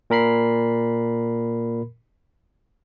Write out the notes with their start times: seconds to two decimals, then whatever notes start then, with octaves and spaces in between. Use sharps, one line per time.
0.10 A#2 A#4 B5 C7